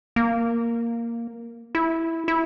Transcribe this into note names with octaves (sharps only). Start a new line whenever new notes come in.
A#3
E4
E4